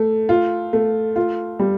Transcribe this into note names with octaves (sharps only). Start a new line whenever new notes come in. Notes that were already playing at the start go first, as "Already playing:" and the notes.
Already playing: A3
F4
A3
F4
G3